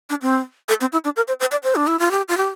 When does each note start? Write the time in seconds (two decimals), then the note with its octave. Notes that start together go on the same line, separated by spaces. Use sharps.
0.10 D4
0.22 C4
0.69 A4
0.81 C4
0.92 E4
1.05 D4
1.16 A#4
1.28 C5
1.40 C5
1.52 D5
1.64 C5
1.76 D4
1.87 E4
1.99 F4
2.11 G4
2.28 F4
2.37 G4